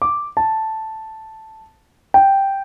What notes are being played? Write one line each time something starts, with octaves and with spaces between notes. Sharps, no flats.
D6
A5
G5